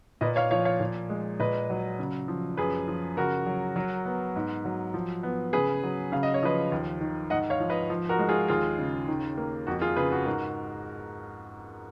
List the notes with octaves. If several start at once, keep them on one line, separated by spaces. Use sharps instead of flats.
A#2 B4 D#5
C#5 F5
F3 C#5 F5
C#5 F5
A#2
G#3
A#2 B4 D#5
F#3
C#3
F3
F#2 G#4 B4
F3
C#3 F#4 A#4
F#3
F#3
B3
G#2
F#3
F3
B3
C#3 G#4 B4
F#3
C#3 F5
D#5
C#5
F3 B4 D#5
D#2
D#3
G#2 D#5 F#5
C#5 F5
F3
B4 D#5
F3
F#4 A#4
G#3
F4 G#4
D#2 F4 G#4
C#3
D#3
A#3
F2 F#4
F4 G#4
C#3 G#4 B4
F#4
G#2 F#4 A#4